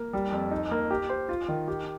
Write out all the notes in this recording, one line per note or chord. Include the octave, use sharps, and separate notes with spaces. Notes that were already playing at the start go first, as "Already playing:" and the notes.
Already playing: A#3
G3
F2
D#4
A#3
G4
C5
F4
D#3
G4